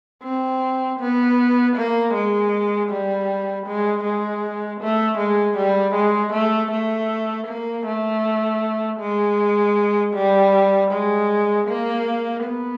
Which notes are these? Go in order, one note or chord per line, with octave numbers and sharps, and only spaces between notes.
C4
B3
A#3
G#3
G3
G#3
G#3
A3
G#3
G3
G#3
A3
A3
A#3
A3
G#3
G3
G#3
A#3
B3